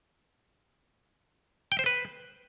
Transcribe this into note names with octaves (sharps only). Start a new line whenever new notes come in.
G5
C5
B4